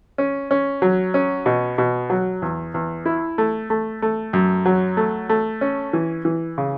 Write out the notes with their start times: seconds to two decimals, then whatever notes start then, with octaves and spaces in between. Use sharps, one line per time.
0.18 C#4
0.51 C#4
0.82 F#3
1.14 C#4
1.46 B2
1.78 B2
2.10 F#3
2.42 E2
2.74 E2
3.06 E4
3.38 A3
3.70 A3
4.02 A3
4.33 F#2
4.66 F#3
4.97 A3
5.29 A3
5.61 C#4
5.93 E3
6.25 E3
6.58 C#3